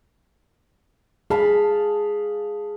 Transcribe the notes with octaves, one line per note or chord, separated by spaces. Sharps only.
G#4 F5 A5 B5